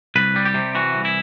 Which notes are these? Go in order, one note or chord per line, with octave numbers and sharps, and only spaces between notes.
C2 B4
G3
G4
C3
E3 F#4
C2
E4